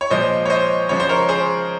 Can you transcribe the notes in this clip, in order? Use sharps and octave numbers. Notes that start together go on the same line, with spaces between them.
C#5
A#2 F3 G#3 C5 D#5
C#5
C5 D#5
C#3 F3 G#3 C#5
C5
A#4 C#5
G#4 C5